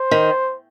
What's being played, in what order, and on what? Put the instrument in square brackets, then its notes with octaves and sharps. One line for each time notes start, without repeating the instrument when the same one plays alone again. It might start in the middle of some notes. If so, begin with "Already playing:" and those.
Already playing: [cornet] C5
[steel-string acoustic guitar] D#3